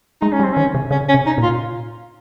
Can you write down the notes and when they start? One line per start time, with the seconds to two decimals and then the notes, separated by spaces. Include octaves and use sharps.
0.21 G#3 D#4
0.32 C#4
0.40 G3
0.43 C4
0.53 D#3 C#4
0.75 C3
0.91 C#3 C#4
1.08 C#4
1.14 C3
1.26 D#4
1.38 A#2
1.43 F4